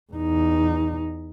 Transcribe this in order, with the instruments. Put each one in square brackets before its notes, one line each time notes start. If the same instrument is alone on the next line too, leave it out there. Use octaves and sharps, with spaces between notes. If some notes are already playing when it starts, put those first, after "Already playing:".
[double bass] E2 D#4